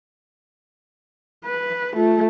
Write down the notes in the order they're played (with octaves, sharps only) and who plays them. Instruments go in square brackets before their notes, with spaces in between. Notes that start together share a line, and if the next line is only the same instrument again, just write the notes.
[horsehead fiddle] B4
[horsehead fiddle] A3 [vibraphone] F4